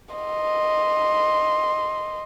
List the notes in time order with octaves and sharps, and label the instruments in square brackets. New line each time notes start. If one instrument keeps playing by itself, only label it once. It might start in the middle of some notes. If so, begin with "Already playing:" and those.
[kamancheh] D#5 C6